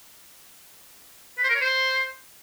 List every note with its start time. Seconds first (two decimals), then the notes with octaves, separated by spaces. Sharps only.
1.38 B4
1.43 C5
1.49 A#4
1.55 C#5
1.61 C5